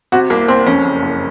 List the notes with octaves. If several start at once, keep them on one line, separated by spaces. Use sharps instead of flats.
C3 F#4
C2 A#3
C2 C4
F2 C#4
F#1
F#1